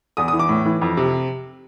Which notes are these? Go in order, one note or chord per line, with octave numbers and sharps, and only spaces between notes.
E2 D#6
D#6
E3
D6
A2
E3
F2
C3